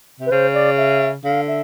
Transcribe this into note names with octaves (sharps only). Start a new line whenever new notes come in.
C3
B4
C#3 C5
D5
E5
D3 F5
E5